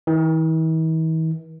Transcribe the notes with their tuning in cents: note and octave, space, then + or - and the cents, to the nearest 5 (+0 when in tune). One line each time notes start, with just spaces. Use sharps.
E3 -45